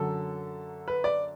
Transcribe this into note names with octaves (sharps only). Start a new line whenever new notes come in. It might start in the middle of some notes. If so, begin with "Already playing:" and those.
Already playing: F#2 D3 F#3 A4
B4
D5